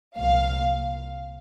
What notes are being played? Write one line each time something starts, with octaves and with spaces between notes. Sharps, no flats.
C2 A#2 F3 F5